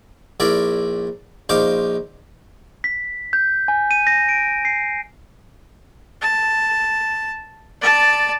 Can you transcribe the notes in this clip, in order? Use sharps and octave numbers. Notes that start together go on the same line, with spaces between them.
A#1 E4 A#4 D5
A#1 D#4 C5 F5 D6
B6
G6
G#5
D#7
A#6
D7
C7
A5
D5 A5